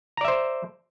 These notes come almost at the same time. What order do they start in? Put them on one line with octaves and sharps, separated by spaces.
A#5 D5 E5 C5